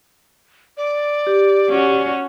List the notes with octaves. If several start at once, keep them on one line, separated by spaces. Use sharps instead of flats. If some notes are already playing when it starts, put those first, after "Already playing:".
D5
G4
C#4 F#4